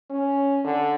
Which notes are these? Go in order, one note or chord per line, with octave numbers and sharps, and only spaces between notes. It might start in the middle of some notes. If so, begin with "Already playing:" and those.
C#4
D3